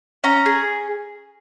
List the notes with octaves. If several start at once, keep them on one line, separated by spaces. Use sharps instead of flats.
C#4 A#5
G#4